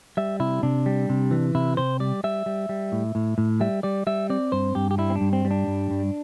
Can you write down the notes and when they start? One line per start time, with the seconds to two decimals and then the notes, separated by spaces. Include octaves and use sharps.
0.17 G3 E5
0.40 C3 E4
0.63 C3 D4
0.86 G3
1.09 C3
1.31 E3
1.55 C3 E4
1.77 C3 C5
2.00 G3 D5
2.24 G3 E5
2.46 G3
2.69 G3
2.92 A2
3.15 A2
3.38 A2
3.61 G3 E5
3.83 G3 D5
4.07 G3 E5
4.30 C4 D5
4.52 G2 C5
4.75 G2 G4
4.91 G4
4.98 G3 E4
5.10 C4
5.16 D4
5.21 G2
5.33 C4
5.45 G3
5.51 D4
5.67 G2
5.90 G2